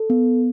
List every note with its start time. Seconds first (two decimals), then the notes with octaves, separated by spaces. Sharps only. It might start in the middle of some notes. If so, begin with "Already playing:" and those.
Already playing: A4
0.10 B3